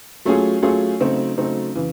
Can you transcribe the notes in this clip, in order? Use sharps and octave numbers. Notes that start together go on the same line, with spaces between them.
F#3 A3 C#4 F4 G#4
F#3 A3 C#4 F4 G#4
C#3 F#3 A3 C4 D#4
C#3 F#3 A3 C4 D#4
C#3 E3